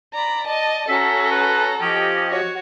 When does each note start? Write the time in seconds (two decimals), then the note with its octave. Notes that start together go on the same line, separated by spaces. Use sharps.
0.14 D5 A#5 B5
0.47 D#5 A5
0.89 C#4 F#4 A4 E5 A#5
1.31 B4
1.81 F3 C#4 G4 D#5 G5
2.30 F#4 C#5